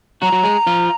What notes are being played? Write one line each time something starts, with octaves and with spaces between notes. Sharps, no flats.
F#3 F#4 A#5
F#3 F#4
G#3 G#4
F3 F4